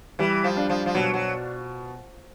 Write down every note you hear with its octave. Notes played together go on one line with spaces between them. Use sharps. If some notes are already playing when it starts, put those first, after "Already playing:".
E3 G3
F3
D4
F3
F3
B2 F#3
F#3